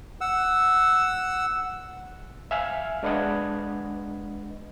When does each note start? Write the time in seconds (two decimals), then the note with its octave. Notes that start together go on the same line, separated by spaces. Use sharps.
0.21 F#5 E6
2.51 E5 F5 G#5 F6
3.03 G#3 D4 B4 D#5 F#5 G#6